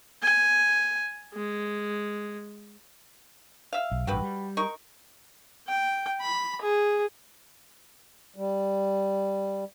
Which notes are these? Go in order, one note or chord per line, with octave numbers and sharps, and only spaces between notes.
G#5
G#3
E5 F5
B1
A1 G2 F#4 G4 B4
G3
D#4 A#4 C#6
G5
B5
G#4
G3